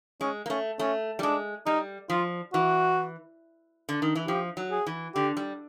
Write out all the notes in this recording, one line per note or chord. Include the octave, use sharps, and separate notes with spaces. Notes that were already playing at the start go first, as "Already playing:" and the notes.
G#3 C#4
A#3
A3 C#4
A3 C#4
G3
G#3 D4
G3 D#4
F3 F4
E3 F#4
D3
D#3
E3
F3 G4
F#3
G#4
E3
D3 G4
G3